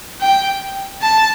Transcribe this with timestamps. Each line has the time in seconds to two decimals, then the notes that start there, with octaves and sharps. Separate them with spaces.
0.21 G5
1.02 A5